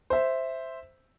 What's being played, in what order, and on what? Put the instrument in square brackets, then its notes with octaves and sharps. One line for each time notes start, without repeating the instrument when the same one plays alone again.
[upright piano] C5 E5